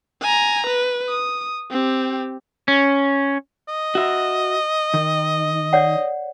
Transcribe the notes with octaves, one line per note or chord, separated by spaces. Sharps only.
G#5 A#5
B4
D#6
C4 G4
C#4
D#5
F#4 E5
D#3
C#5 D5 F#5